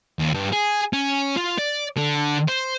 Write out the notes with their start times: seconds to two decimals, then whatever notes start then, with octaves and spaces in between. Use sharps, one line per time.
0.19 D#2
0.34 G2
0.53 G#4
0.93 C#4
1.37 F4
1.59 D5
1.97 D3
2.49 C5